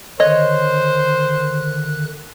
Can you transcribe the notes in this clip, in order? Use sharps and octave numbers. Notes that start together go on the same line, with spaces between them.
D3 D#3 C5 C#5 D#5 F#6